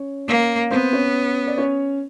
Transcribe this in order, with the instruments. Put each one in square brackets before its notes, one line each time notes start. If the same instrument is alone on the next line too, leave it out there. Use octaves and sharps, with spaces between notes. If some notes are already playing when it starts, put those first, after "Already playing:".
Already playing: [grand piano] C#4 C#5
[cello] A#3
[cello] B3 [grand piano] C4 C5
[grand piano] C#4 C#5
D5
C#4 C#5